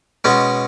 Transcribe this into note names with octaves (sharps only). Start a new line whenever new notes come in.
B2 G#3 C#4